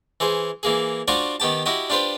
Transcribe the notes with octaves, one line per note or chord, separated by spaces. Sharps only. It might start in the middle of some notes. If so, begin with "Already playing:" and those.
E3 G#4 C5
E3 A#3 G#4
D4 F4 F#4 C5 C#6 D6
D#3 B3 G4 A5
E4 F#4 G4 D#5
D4 F4 G4 B4 C5